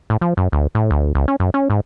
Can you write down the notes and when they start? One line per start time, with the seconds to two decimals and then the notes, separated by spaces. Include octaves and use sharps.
0.10 A2
0.21 F3
0.37 F#2
0.52 D2
0.75 A2
0.91 D2
1.15 C#2
1.28 C#4
1.40 F#2
1.54 C#4
1.70 G#2